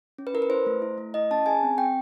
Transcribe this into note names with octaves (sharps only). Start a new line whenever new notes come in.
C#4
B4
E4 A#4
B4
E4 C5
A3
E4
A3
E4 D#5
C#4 A5
G#4 G#5
C4
C4 G5